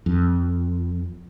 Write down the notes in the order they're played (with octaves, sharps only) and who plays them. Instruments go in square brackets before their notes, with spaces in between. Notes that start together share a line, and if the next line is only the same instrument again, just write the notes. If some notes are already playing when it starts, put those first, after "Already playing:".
[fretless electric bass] F2